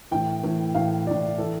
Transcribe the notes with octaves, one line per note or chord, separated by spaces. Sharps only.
A2 E3 G5
A2 E3
A2 E3 F5
A2 E3 D5
E3 A4